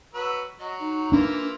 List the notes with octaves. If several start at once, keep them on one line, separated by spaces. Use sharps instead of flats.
F#3 B4 E6
F#3 D#5
D#4
E3 A#3 D4 F4